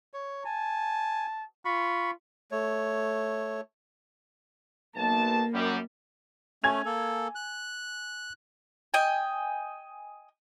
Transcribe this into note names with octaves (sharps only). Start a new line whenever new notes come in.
C#5
G#5 A5
F4 B5 C#6
A3 C#5
B1 A#3 A5
F#2 G3
A3 C#4 G#5 G#6 F7
A#3 A4
F#6
D#5 G5 G#5